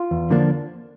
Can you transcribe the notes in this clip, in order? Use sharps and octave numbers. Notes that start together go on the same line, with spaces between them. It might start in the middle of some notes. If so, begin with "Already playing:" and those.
Already playing: F4
E2
D3 F3 A#3 D4